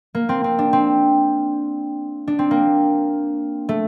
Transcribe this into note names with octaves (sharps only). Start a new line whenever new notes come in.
A#3
C4
C4
D4
C4
D4
C4
A#3
A3